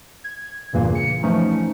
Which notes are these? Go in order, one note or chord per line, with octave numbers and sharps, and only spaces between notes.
G#6
E2 G2 A#2 C#3 E3 A#3
C#7
E3 F3 A3 C#4 D#4